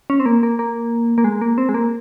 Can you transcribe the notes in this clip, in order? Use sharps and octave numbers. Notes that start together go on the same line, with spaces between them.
C#4
C4
A#3
A#3
A#3
A#3
G#3
A#3
C4
G#3
A#3